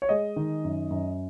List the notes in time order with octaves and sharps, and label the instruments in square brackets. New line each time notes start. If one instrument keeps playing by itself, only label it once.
[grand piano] C#5
G#3 D#5
D#3
F#2
F#2